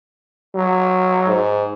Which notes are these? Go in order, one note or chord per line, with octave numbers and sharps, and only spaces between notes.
F#3
G#2